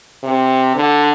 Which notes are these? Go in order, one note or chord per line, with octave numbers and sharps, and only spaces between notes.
C3
D3